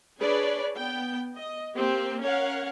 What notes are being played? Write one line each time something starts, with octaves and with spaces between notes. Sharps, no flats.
D4 G#4 B4 C#5 D5
B3 G5
D#5
A#3 C4 G4
C#4 A#4 C#5 F5 F#5